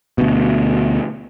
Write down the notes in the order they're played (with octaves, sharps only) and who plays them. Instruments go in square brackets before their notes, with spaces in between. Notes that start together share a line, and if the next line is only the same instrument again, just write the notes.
[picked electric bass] D2 B2